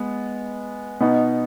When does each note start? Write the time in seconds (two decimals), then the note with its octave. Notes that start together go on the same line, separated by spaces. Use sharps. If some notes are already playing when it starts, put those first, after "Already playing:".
Already playing: G#3 B3
1.00 B2 B3 D#4